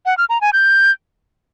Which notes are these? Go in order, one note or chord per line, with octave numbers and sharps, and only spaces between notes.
F#5
F6
A#5
G#5
G6